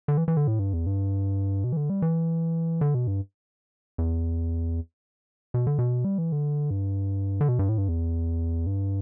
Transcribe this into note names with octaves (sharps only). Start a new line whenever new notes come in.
D3
E3
E3
D3
A2
G2
E2
G2
B2
E3
D3
G3
E3
D3
B2
G2
E2
B2
D3
B2
G3
E3
D3
G2
D3
B2
G2
A2
G2
E2
G2